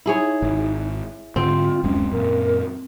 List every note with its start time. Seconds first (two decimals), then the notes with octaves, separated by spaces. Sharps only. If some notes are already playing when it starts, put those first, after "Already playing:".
0.06 D#4 E4 G#4 C#5
0.42 G#1
1.36 G#2 D3 C4 F4
1.83 D1 F#2 G#3 C#4
2.12 F#2 A#2 A#4